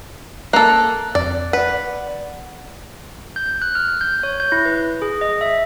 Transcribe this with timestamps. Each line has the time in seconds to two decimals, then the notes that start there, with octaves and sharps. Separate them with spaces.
0.53 A#3 A4 F#6
1.15 F2 D5
1.53 B4 D5 F#5
3.36 G6
3.62 F#6
3.75 F6
4.01 G6
4.23 C#5
4.40 G6
4.52 E4
4.65 B4
5.02 G#4
5.21 D#5
5.41 E5